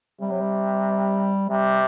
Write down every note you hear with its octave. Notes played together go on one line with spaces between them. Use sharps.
C3 G3
F#3
G3
C3 G3